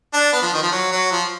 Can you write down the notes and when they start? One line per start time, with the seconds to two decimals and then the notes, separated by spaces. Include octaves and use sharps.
0.14 D4
0.32 B3
0.42 F3
0.53 D#3
0.62 F3
0.72 F#3
0.92 F#3
1.12 F3